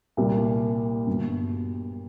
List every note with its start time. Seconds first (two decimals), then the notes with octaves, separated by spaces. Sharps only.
0.17 C2 A#2 G3
1.07 G1 G2 F#3